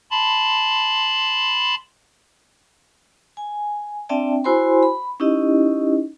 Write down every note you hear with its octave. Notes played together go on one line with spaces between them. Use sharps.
A5 B5 C6
G#5
C4 D4 D5 E5 G5 A5
E4 F#4 C5 G#5 B5 C6
B5
C#4 D#4 E4 G4 D#5